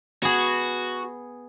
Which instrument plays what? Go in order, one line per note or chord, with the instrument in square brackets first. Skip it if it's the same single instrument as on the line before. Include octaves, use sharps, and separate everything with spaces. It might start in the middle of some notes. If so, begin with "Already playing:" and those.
[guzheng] B3 G#4 [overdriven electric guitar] F#4